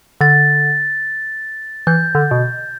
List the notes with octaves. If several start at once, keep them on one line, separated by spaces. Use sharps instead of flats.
D3 A6
E3 G6
D3
B2